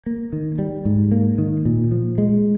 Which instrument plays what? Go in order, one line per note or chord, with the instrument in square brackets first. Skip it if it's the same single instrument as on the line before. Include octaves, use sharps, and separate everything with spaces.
[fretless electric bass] A#3
D#3
G3
G#2
A#3
D#3
A#2
F3
G#3